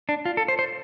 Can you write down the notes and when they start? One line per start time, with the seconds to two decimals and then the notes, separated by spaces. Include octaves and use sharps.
0.09 D4
0.25 F4
0.37 A4
0.48 C5
0.59 C5